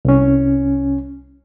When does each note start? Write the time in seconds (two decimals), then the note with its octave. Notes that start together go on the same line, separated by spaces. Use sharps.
0.05 C2 C#4